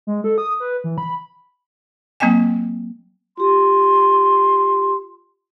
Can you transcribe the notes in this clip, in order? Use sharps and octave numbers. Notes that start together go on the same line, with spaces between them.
G#3
A4
D#6
B4
E3
B5
F#3 A#3 C4 D#5 G5 G#5
F4 G4 C6